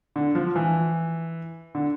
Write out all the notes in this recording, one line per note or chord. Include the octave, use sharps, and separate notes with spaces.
D3
F3
E3
D3